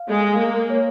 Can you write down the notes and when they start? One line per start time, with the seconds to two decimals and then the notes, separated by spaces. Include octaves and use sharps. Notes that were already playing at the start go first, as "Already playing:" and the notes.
Already playing: F5
0.10 G#3
0.25 F5
0.40 A#3
0.70 C#5